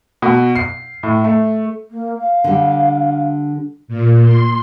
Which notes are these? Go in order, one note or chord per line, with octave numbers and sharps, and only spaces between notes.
B2
C7
A2
A3
A#3
F5
D3 G3
A#2
C6